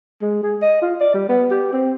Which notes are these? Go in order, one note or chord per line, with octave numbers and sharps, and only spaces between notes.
G#3
G#4
D#5
F4
D5
G3
B3
G4
C4